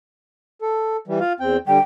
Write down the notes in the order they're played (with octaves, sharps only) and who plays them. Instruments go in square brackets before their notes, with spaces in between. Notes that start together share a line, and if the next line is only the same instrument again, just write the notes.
[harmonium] A4
E3 G3
F4 F5
E2 C4 G5
[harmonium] D3 G3 [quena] G5